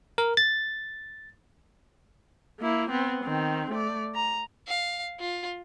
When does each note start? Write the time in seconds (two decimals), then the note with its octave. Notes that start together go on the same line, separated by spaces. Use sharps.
0.18 A#4
0.37 A6
2.60 A#3 E4
2.90 B3 C4
3.24 D#3 C4
3.71 A3 D5
4.15 A#5
4.68 F5
5.20 F4